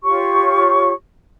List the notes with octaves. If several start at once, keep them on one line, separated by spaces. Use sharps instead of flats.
F4 G4 C#5 C#6